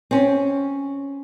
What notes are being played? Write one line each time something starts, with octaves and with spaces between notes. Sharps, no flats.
C4 C#4